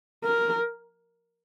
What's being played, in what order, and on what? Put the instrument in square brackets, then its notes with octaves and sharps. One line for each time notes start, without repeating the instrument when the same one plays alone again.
[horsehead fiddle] A#4